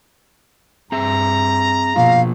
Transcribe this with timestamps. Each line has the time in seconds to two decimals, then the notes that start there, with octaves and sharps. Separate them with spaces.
0.92 G2 C4 G#4 E5 A#5
1.96 B2 F3 A#3 F4 F5